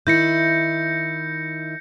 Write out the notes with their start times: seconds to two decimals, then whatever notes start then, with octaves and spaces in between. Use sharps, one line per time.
0.07 D#3 E4 G6 A#6 C#7